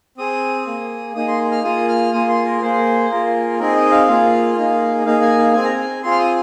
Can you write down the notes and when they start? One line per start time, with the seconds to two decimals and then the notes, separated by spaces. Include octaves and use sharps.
0.18 C4 G#4 D#6
0.66 A#3 G#4
1.15 A#3 D#4 G#4 D#6
1.28 C6
1.52 F6
1.64 A#3 F4 G#4 D#6
1.89 F6
2.12 A#3 F4 G#4 D#6
2.29 C6
2.45 A#4
2.61 A#3 G#4 C5
3.10 A#3 F4 G#4 A#4
3.59 C4 D#4 G#4 A#4
3.75 D#5
3.92 F5
4.08 A#3 F4 G#4
4.56 A#3 D#4 G#4
5.05 A#3 D#4 G#4 F5
5.21 G#5
5.38 F5
5.53 C4 G#4 G#5
5.65 A#5
5.76 G#5
6.03 C4 F4 G#4 C6
6.11 F6
6.19 D#6